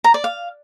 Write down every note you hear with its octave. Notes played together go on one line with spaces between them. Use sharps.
A#5
D5
F5